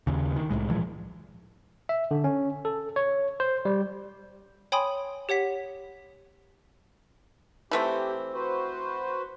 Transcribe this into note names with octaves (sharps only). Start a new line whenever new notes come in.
D#2 C#3
D#3
C2 F2 A2 G#3
A#2 E3 F3 G#3
E5
D3
C#4
A4
C#5
C5
G3
C#5 G5 G#5 B5 C6 D#6
G4 C#5 F#5 B6
E3 A3 C4 G4
F#4 B4 C5